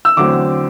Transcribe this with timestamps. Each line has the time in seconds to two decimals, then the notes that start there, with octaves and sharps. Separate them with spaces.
0.05 E6
0.16 E2 D3 F#3 A3 C4 D6